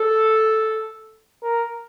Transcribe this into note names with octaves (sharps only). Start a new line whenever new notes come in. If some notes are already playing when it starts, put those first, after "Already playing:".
Already playing: A4
A#4